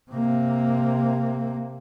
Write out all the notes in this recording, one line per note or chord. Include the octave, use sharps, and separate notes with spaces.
C3 A#3